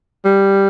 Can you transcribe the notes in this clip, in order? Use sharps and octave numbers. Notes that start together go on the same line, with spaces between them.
G3